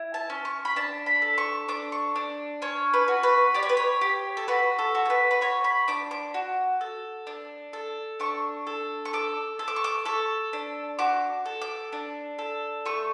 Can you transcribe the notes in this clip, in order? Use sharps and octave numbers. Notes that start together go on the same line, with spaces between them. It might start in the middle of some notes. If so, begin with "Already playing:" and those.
Already playing: E4
A5
C#4
C#6
B5
D4 A5
B5
A4
C#6
D4 D6
C#6
D4
C#4 C#5
B4
F#4
B4
G4 D5
C#5
B4
C#5
G4
A4
F#4 B4
A4
F#4
A4
B4
B4
F#4 C#5
B5
D4 D6
D6
F#4
A4
D4
A4
D4 C#6
A4
C#6
A4 D6
A4
D6
C#6
D6
A4 C#6
D4
F#4 D6
A4
D6
D4
A4
A3 C#6